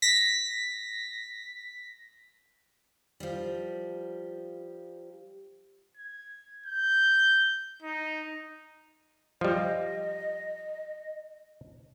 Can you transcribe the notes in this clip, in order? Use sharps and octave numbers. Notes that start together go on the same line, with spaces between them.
A#6 B6
F3 G3
G#6
G6
D#4
F3 G3 D#5